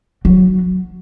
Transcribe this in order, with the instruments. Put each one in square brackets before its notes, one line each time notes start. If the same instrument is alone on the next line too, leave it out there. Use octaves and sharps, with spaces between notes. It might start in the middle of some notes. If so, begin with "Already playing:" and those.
[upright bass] F#3